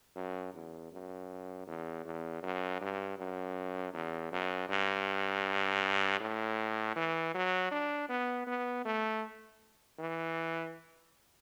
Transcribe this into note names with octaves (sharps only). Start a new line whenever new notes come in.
F#2
E2
F#2
E2
E2
F#2
G2
F#2
E2
F#2
G2
A2
E3
F#3
D4
B3
B3
A3
E3